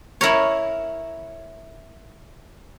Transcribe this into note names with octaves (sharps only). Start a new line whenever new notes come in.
E4 A#4 C#5